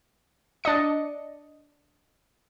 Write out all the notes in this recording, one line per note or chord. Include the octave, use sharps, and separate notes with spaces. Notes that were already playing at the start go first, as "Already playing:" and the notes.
D4 D5 D#5 C#7